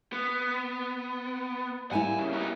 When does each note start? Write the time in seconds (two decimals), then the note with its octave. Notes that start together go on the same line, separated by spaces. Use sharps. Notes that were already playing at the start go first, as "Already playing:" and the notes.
0.12 B3
1.91 G3 A#3 E4 F#5 G#5
2.19 C#3
2.32 B3 D#4